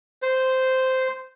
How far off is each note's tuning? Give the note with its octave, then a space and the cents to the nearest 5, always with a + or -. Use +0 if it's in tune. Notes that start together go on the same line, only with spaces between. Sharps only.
C5 -10